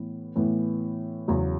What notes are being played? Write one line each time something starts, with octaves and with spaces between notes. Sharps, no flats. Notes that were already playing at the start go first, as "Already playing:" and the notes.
Already playing: A2 E3 B3
A2 E3 B3
E2 C#3 F#3